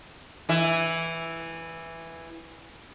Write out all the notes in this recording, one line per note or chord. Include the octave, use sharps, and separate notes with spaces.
E3 E5